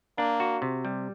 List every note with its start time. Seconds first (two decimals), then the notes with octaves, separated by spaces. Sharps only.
0.18 A#3 D4
0.40 F#4
0.62 C3
0.85 G3